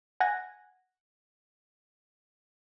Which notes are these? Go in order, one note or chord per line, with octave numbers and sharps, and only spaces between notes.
F#5 G#5 F#6 G#6 A#6